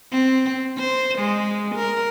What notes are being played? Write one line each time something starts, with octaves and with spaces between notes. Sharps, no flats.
C4
C5
G#3
A#4